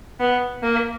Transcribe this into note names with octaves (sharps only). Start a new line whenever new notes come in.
B3
A#3